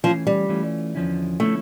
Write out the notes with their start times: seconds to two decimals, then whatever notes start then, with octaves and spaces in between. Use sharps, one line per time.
0.04 E3 F3 A3 C#4 F4
0.27 G3
0.49 E3 A3 C#4 F4
0.95 E2 D3 F3 C#4 E4
1.40 D3 F3 A3 C#4 E4